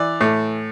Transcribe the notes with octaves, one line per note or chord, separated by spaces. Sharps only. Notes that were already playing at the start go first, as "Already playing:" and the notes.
Already playing: E3 D5
A2